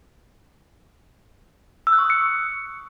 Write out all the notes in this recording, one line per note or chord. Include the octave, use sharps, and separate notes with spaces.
E6
F#6
C#6
D#6
C#7